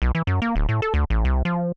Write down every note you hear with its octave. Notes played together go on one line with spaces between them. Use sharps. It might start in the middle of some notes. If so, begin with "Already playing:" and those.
B1
E3
F#2
A#3
D1
A2
A4
D2
A1
C2
F3